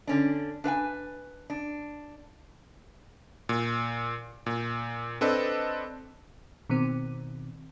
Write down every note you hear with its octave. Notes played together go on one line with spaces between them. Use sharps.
D3 C#4 D4
D4 B4 F#5 G#5
D4
A#2
A#2
C4 D4 A4 B4 D#5
B2 D#3 C4